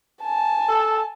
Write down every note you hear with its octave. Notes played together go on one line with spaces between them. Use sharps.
G#5 A5
A4